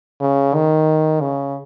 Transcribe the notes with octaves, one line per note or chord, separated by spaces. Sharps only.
C#3
D#3
C#3